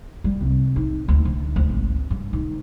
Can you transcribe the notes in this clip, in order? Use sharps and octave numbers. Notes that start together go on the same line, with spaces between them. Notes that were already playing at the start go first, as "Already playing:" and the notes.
G3
C2
D#4
D2
D3
D2
G#1
G2
D#3